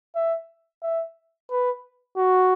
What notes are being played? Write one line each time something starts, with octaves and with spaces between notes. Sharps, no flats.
E5
E5
B4
F#4